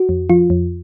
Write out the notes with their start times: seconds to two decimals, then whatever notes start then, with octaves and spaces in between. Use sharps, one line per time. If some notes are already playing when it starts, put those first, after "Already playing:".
Already playing: F#4
0.09 F2
0.30 F3 F4
0.50 F2